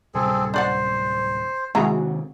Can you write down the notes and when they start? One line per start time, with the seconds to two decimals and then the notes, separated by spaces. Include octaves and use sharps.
0.15 D1 C3 G3 C4 G#4 A4
0.54 D4 C5 D5 F#5
1.75 C3 D#3 G#3 C4 E4 F#4 G#4 A#5